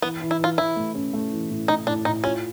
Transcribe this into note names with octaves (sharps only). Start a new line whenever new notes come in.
E3 B3
E3
E4
E3 F4
E3 E4
A3
C#4
A3
E3
A2
A3 D#4
A2 D4
A2 D#4
C#4 F4